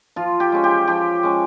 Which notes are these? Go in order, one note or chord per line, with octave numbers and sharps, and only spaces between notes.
F3 F4
G4
G#3 C#4
G4
F3 G4
G#3 C#4